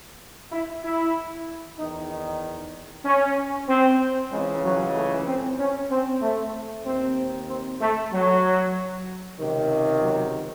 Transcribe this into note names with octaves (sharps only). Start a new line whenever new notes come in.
E4
E4
E2 D#3 D#4
D#4
C#4
C4
C#2 C#3 E3 G#3
F#3
A3
C4
C#4
C4
A3
D#2 D#3 C4
C4
A3
F#3
C#2 C3 D#3
F#3